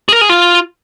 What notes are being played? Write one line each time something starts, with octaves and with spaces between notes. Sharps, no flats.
G#4
A#4
G#4
F4